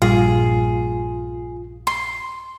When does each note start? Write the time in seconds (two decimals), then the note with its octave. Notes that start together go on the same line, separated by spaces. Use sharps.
0.02 A#1 G2 A#2 G3 F4 G#4
1.87 C6